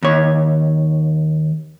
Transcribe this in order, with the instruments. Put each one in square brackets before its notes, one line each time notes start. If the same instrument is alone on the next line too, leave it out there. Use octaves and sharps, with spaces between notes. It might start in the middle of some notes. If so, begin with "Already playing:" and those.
[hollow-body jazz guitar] D#2 C#5